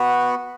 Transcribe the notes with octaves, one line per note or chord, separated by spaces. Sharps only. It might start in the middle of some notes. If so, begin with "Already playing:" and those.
Already playing: B3 F#4